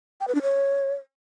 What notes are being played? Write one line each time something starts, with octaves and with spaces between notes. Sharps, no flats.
G5
B4
D4
C#5